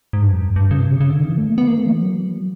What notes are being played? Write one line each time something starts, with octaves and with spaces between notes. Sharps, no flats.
G#2
G2
F2
G2
G2
C#3
C3
C#3
C#3
D3
D#3
E3
A3
A#3
B3
A#3
A3
E3
F#3